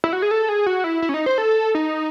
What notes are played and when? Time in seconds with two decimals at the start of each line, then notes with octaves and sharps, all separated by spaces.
0.04 E4
0.13 F#4
0.22 G#4
0.31 A4
0.49 G#4
0.66 F#4
0.84 E4
1.02 E4
1.09 C#4
1.14 D#4
1.26 C5
1.38 A4
1.75 D#4